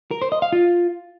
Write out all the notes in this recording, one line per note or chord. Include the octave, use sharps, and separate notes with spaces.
A#4
C5
D#5
F5
F4